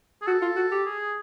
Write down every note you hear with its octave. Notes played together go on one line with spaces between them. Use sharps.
G#4
F#4 A4
F4
F#4
G4
G#4